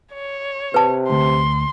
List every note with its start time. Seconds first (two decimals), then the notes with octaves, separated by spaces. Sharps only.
0.14 C#5
0.74 C3 B4 A5
1.10 D2 C6